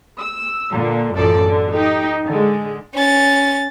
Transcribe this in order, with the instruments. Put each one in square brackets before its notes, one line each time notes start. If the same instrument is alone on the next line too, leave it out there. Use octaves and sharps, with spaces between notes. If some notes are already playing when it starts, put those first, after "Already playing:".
[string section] E6
A#2 D3
A1 F#2 F3 A4 D5
D3
D#4 G4
D3 G#3
[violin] C#4 A6